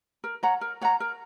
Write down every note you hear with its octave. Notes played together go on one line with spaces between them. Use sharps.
A#4
C#5 F#5 A#5
A#4
C#5 F#5 A#5
A#4